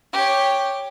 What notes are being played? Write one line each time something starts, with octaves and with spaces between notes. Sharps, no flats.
G4 C#5